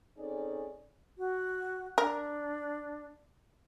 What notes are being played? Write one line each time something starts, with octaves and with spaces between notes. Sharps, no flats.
C4 C#4 D#4 G#4 A4 D5
F#4
D4 A#4